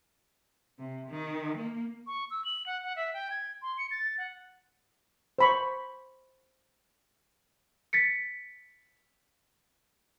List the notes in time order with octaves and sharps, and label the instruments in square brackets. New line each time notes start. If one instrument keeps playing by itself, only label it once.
[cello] C3
D#3
A#3
[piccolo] C#6
E6
F#7
F#5
F#5
E5
G5
G#6
C6
C#7
A6
F#5
[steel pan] C5 B5 C#6
[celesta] A6 B6 C#7